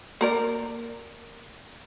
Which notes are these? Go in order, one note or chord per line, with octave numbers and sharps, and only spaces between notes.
A#3 A#4 D5